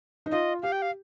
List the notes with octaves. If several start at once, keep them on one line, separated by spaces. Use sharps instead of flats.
D#4
F4 D#5
G4 F5
G5
F5